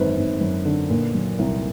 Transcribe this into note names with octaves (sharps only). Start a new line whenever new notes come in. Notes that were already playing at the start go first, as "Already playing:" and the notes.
Already playing: G#1 F#2 D3 B4 C5
G#1
F#2
D3
A#2
F#3
C2